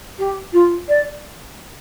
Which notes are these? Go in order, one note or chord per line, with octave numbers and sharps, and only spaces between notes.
G4
F4
D5